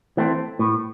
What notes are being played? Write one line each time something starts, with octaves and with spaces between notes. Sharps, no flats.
E3 A3 C4
A2